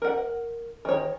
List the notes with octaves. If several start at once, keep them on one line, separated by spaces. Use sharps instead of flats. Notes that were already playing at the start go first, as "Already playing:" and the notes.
A#4 F#5
D#3 C#5